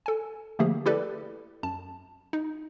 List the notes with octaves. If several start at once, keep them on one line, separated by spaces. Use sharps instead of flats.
A4 G#5
D3 F3 A3 A#3 G4 G#4
E4 G4 A4 B4 D5
F#2 A5
D#4